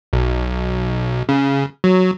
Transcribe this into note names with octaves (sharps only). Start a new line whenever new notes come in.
B1
C#3
F#3